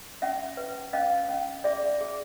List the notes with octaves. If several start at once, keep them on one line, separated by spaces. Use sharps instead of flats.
C#4 E5 F#5
B4
C#4 D#5 F5
C#4
G#4 D5 E5
G#4